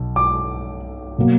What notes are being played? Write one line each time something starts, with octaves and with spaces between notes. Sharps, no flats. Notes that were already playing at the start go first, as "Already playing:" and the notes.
Already playing: B1
D6
B2 F#3 A#3